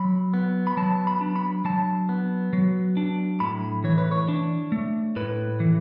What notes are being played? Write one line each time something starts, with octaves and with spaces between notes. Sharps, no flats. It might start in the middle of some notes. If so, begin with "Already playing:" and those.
Already playing: F#3 B5
B3
B5
F#3 A5
B5
D4
B5
F#3 A5
B3
F#3
D4
A2 B5
E3 C#5
B4
C#5
D4
A3
A2 B4
E3